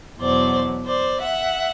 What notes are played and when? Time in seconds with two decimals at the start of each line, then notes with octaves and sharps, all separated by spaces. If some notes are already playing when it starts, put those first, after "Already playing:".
0.21 E2 B2 F#3 C5 D5
0.87 C5 D5
1.21 E5 F#5